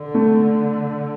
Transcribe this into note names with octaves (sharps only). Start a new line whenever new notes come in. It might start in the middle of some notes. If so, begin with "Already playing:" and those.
Already playing: D3
A3